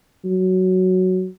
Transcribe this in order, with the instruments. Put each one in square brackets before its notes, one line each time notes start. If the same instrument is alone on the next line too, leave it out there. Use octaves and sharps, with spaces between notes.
[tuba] F#3